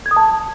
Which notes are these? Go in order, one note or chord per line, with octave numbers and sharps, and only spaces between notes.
G#6
D#6
A5